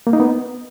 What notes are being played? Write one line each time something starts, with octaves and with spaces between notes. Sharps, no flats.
A#3
D#4
B3